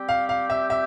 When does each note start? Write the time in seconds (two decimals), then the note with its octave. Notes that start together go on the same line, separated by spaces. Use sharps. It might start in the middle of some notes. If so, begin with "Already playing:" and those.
Already playing: G3 C4 G4
0.09 F5
0.29 F5
0.50 E5
0.70 E5